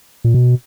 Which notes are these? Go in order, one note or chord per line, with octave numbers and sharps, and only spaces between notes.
A#2
B2